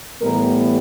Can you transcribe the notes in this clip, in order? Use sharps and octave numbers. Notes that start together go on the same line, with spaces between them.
A2 E3 G3 B3 A#4